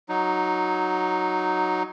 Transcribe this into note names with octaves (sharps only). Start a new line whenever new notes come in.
F#3 D#4